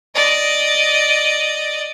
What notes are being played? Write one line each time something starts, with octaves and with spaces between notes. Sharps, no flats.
D5 D#5